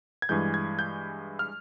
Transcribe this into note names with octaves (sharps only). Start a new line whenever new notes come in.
G#6
G2 E3 G#3 G6
G#6
G6
F6